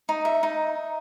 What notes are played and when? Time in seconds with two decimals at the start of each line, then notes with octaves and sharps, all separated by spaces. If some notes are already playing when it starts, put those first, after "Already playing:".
0.09 D#4
0.25 E5
0.43 D#4